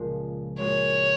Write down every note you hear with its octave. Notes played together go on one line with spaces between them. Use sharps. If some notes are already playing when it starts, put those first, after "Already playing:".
Already playing: C#2 A#2 F3 G#3
A#2 G#3 D#4 F#4 C#5